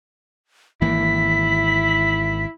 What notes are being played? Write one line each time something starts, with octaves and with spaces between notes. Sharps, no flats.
G#1 E3 A#3 E4 B6